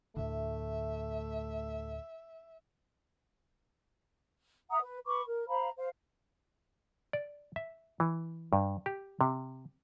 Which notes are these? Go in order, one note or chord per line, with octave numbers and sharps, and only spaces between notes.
D2 A2 D3 A3 E5
E5 F#5 A#5 D#6
B4
B4 B5 C#6 D6
A#4
C5 F5 A#5 B5
C5 F5
D5
E5
E3
G2
G4
C3